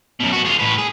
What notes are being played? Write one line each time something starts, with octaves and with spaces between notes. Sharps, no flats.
F#2 B2
B3 F#4
F4 G#4
A2 B4
G#4